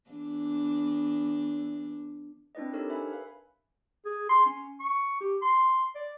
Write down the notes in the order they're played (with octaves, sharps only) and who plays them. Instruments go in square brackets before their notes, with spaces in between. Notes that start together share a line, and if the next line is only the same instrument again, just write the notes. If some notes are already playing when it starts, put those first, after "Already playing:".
[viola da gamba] E2 D4
[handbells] C4 D4 E4 B4 D5 D#5
D4 D#4 G4 A4 A#4 C#5
B4 E5 G#5 B5
B4 F5
[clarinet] G#4
C6
C#4
C#6
G4
C6
D5